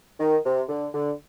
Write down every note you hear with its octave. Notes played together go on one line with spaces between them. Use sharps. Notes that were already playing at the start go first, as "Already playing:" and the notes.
D#3
C3
D3
D3